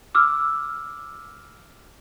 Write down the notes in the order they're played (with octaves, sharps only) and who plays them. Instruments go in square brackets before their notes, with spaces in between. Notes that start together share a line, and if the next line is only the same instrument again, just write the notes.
[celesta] D6 E6 F6